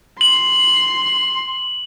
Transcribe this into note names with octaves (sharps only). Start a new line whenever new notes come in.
C6 F#7